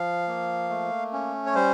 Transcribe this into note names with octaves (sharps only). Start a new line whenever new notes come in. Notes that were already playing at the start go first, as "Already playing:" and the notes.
Already playing: F3 F5
A#3
A3
C#4
C#5
G3 C5